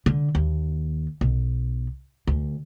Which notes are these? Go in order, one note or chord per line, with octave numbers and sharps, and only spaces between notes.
D3
D#2
B1
D2